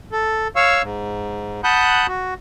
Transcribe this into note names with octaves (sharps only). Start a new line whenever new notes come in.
A4
C#5 F5 C#6 E6
G#2
F#5 A5 B5 D#6 F#6 G6
F#4